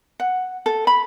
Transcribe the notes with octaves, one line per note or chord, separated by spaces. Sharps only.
F#5
A4
B5